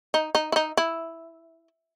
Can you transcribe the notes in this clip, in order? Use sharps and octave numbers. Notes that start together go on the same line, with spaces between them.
D#4
D#4
E4
D#4
E4